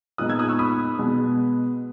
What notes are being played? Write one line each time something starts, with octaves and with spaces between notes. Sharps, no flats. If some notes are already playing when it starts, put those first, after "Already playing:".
A#2 G#3 B3 D#4 D#6 F#6
E6 G#6
D#6 F#6
C#6 E6
B5 D#6
B2 G#3 B3